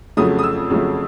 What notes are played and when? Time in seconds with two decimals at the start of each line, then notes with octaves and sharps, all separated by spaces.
0.17 F2 C#3 F#3 A3 D#6
0.39 D#6
0.43 E6
0.70 F2 C#3 F#3 A3